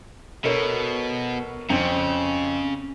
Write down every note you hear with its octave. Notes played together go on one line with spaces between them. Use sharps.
B2 A4 A#4 C#5
F2 C#3 C4